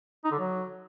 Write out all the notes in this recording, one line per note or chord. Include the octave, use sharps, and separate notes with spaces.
D#4
D3
F#3